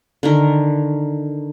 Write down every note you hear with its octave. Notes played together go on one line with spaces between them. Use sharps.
D3 D#3 A#4